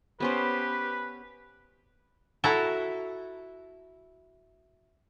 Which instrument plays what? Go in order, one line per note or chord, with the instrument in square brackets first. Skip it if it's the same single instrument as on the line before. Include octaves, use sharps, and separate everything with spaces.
[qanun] B3 C#4 C5 [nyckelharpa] G4 [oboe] B4
[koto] E4 F#4 A4 A#5